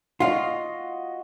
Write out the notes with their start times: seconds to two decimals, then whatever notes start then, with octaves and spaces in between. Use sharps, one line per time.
0.20 F4 F#4 D#5 F5